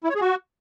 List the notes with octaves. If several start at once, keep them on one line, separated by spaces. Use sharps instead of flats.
E4
C#5
G#4
F#4